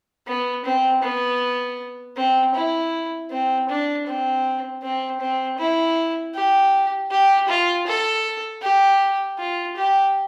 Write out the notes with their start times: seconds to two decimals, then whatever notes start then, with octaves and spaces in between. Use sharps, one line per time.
0.27 B3
0.65 C4
1.03 B3
2.17 C4
2.55 E4
3.31 C4
3.69 D4
4.07 C4
4.83 C4
5.21 C4
5.59 E4
6.35 G4
7.11 G4
7.49 F4
7.87 A4
8.63 G4
9.39 F4
9.77 G4